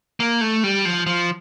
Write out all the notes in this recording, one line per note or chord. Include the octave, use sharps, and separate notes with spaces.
A#3
A3
G3
F3
F3